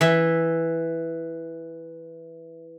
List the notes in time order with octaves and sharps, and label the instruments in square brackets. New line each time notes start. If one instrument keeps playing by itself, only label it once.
[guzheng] E3 E5